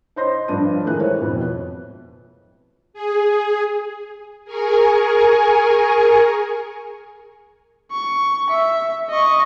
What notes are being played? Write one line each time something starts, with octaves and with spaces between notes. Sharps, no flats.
C5 C#5 D#5 C6 G6 A#6
G2 F3 D4 D#7
D#1 E3 G#3 A#4 F#6
E4 C5 C#5
F2 B2
G#4
G#4 A#4 G#5 C#6
C#6
E5
D#5 C#6